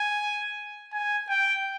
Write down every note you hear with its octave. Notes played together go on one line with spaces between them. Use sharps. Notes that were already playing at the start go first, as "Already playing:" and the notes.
Already playing: G#5
G#5
G5